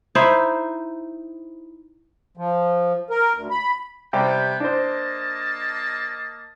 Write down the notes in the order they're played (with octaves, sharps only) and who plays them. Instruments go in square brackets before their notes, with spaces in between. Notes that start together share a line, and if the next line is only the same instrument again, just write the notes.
[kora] D#4 E4 C5 E5
[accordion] F3
A#4
D2
B5
[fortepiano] C3 G3 G4 [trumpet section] B3 G5
[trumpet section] A#3 D#5 A5 [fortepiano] D4 C5